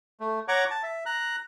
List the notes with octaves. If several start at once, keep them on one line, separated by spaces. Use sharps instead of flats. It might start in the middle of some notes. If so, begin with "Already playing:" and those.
A3
C#5 F#5 A#5 C#6 D6
A5
E5
A#5 F#6